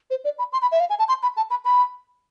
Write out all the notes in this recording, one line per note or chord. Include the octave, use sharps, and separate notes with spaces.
C5
D5
B5
C6
B5
E5
F5
G#5
A5
C6
B5
A5
B5
B5